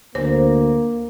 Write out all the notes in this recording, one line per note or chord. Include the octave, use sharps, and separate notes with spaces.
D2 A#3 C5